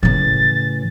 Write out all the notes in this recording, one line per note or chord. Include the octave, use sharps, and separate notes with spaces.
A2 C#3 E3 A6